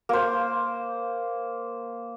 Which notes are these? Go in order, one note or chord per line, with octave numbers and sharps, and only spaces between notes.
A#3 C5